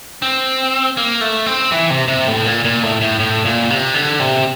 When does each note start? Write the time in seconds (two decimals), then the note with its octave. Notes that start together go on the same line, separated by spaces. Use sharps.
0.22 C4
0.97 A#3
1.21 A3
1.46 C4
1.72 E3
1.90 C3
2.08 C3
2.28 A2
2.46 A#2
2.65 A#2
2.83 A2
3.01 A2
3.20 A2
3.45 A#2
3.70 C3
3.94 D3
4.20 C3